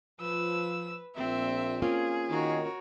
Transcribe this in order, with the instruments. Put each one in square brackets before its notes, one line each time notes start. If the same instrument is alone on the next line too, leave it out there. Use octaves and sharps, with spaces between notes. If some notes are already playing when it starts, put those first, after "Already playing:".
[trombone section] F3 [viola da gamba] B4 [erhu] E6
[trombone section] A#1 A#2 [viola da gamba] C4 [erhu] E5
[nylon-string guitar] A#3 C#4 F4 [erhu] G#4
[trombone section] D#3 [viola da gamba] F#4 A#4 C#5